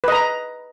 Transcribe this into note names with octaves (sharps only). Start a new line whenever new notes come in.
B4 D#5 A#5